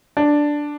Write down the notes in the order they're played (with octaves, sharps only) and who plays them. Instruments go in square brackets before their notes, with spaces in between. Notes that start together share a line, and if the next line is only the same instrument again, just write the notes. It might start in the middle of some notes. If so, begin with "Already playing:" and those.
[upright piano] D4